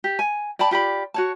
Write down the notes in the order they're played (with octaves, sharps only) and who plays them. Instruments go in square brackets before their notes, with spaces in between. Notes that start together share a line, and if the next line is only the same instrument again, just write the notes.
[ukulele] G4
G#5
D5 G5 A5 B5
F4 G4 D5 B5
F#4 C#5 A5